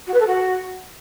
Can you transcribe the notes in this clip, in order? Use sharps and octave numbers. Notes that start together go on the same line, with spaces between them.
F#4
B4
A4
F#4